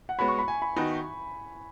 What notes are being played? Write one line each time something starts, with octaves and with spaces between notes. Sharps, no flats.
F#5
G#3 B3 F#4 C#5 B5
C#6
B5
G#5
B5
D#3 B3 D#4 F#4